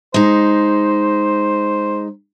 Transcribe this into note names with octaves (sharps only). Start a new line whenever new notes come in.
G#3 D#4 C5